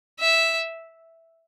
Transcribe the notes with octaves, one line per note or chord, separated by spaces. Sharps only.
E5